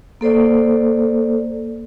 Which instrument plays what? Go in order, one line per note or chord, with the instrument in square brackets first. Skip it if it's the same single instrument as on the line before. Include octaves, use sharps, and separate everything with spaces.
[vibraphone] A#3 A4 C5 D5